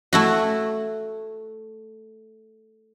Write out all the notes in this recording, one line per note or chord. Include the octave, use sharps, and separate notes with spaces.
A3 E4 F#4